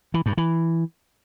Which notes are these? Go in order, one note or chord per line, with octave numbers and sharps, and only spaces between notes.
E3
G2
E3